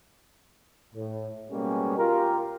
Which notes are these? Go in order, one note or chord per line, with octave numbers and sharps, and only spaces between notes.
A2
B2 G3 G#3 A#3 C#4 G4
F4 G4 A#4